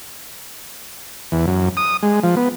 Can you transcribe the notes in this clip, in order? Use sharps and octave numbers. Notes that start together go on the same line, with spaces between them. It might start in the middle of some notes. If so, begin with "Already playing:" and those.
E2
F#2
D#6
G#3
F3
B3